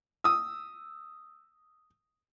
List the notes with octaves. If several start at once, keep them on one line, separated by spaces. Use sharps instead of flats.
D#6 E6